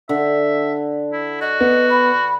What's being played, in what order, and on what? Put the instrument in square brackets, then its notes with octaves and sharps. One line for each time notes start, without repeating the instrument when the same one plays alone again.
[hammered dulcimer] D3 [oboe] E5
[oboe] E4
[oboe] F#4 [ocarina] D#5
[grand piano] B3
[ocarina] B5